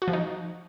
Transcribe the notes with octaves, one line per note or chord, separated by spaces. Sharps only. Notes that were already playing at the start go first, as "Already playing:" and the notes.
F#4
F3
D#4